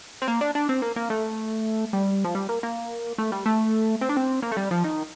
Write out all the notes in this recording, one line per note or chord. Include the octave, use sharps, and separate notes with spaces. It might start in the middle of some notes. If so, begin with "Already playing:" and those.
C4
A#3
D4
D4
C4
A#3
A#3
A3
G3
F3
G3
A#3
A#3
A3
G3
A3
C4
D4
C4
A#3
A3
G3
F3
D#3